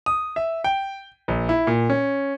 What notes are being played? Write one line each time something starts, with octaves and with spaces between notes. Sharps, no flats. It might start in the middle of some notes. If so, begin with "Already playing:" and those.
D#6
E5
G5
A#1
E4
A#2
C#4